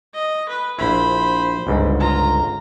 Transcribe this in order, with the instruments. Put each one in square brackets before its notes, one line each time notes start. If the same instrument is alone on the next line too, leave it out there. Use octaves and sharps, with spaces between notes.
[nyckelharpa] D#5
B4
[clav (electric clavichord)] A#1 E4 [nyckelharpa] C5 B5
[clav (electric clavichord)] G1 C#2 G#2
[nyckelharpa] F4 A#5